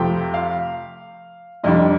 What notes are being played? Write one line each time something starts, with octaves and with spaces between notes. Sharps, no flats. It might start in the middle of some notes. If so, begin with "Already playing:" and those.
Already playing: F2 C3 F3 A3 G5
F5
F1 F2 C3 G3 D4 D#5